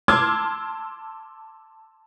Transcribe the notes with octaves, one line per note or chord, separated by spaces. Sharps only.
A5 C6 D6 E6 F6 G#6